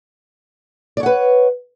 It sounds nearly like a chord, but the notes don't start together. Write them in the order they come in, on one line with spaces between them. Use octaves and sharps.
D5 C#5 F#5 B4